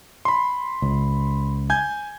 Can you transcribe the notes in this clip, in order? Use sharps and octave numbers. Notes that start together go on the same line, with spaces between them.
B5 C6
C#2
G#5 G6 G#6